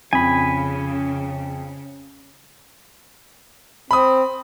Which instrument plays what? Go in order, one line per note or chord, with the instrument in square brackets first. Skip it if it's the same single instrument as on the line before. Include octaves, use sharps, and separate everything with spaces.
[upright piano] F2 [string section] C#3 [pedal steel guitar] G#5 B5
[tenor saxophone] C4 [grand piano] B5 D#6